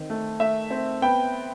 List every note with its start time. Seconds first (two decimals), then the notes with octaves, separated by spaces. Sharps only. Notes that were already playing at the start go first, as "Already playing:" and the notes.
Already playing: D#3 C4
0.10 A3
0.40 A3 E5
0.70 C4
1.02 B3 G5